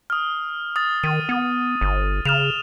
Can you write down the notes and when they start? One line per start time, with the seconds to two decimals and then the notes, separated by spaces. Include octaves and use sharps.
0.10 D#6 F6
0.76 D#6 A6
1.04 D#3 D#7
1.29 B3
1.81 G1
2.25 C#3 F6 E7 F7